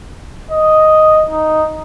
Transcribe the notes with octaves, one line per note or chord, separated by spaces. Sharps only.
D#5
D#4